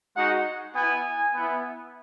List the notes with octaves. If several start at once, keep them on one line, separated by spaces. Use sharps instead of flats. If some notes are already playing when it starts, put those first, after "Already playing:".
G#3 D#4 F#4 F#5
B3 E4 G#5
B3 E4